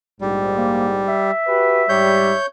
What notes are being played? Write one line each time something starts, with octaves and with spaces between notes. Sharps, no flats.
A#1 G#2 G3
A#3
E5
F#4 G4 B4
G#2 G3 C#5 G6